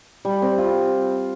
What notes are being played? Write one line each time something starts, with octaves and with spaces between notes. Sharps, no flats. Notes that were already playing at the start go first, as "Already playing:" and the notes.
G3
C4
F4